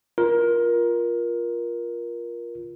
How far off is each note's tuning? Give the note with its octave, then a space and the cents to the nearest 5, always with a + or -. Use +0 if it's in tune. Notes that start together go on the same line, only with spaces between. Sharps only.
F4 +0 A#4 +20